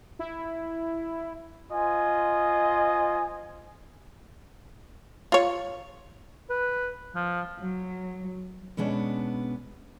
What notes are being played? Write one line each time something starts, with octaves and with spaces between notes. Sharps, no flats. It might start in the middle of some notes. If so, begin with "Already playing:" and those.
E4
F4 C5 D#5 G#5
F4 C#5
B4
F3
F#3
B2 G#3 B3 C#4 D4